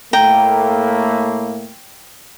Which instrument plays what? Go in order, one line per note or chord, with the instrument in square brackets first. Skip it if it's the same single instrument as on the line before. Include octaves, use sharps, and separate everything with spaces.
[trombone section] A2 A3 A#3 [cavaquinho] G5 A#5